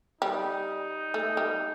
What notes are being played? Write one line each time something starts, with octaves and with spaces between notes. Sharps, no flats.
G3 D#4
A3
G3